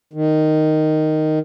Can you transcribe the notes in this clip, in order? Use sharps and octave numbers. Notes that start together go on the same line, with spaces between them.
D#3